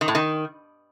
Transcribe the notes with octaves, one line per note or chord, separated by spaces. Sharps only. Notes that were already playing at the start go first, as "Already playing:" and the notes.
D#3
A2
D#3